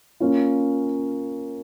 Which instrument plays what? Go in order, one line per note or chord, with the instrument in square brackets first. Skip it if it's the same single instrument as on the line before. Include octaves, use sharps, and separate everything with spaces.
[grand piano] A#3 C#4 F4